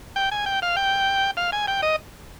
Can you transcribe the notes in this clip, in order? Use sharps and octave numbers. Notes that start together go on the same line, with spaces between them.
G5
G#5
G5
F5
G5
F5
G#5
G5
D#5